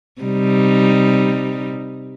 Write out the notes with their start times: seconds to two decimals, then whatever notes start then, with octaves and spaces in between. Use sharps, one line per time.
0.22 C3 G3 D#4